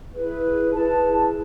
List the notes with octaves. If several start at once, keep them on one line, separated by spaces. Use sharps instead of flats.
E4 G#4 B4
E4 G#4 B4 A5